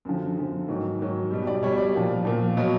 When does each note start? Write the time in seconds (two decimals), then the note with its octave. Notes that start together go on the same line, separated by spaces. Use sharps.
0.05 F#2 D3 F3
0.37 F#2 D3 F3
0.68 G#2 D#3 F#3
0.99 G#2 D#3 F#3
1.31 B2 G3
1.47 D5
1.62 B2 G3 C#5
1.78 D5
1.94 A#2 F3
2.25 A#2 F3
2.57 B2 F#3